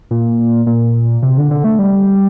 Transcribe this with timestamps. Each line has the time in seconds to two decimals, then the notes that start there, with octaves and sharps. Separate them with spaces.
0.11 A#2
0.67 A#2
1.23 C3
1.37 D3
1.51 D3
1.64 A3
1.79 G3